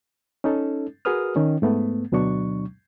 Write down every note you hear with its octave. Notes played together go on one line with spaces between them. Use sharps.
C#4 D#4 A4
F#4 G#4 A#4 B4 D#6 F6
D#3 C#4
G#2 A3 B3
D2 B2 F#3 D4 C#6